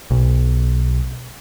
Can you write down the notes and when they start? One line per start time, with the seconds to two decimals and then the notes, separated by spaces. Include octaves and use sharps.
0.11 B1